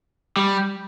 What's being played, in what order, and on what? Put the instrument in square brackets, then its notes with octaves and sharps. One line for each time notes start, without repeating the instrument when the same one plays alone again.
[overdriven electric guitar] G3